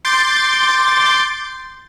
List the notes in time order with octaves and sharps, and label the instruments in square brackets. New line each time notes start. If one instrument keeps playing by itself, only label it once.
[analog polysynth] C6 D6 G6 A6